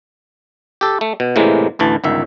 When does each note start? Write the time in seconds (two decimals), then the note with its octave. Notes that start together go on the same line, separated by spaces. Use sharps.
0.81 G4 A4
1.01 A3
1.20 B2
1.36 A2 C3 E3 G#3 A#3
1.79 A1 D2 E3 A5
2.04 G1 C#2 D#3 E5